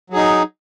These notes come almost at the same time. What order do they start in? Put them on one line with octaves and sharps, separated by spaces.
F#3 G#4 D#4